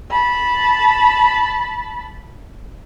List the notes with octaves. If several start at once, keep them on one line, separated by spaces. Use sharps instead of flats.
A5 B5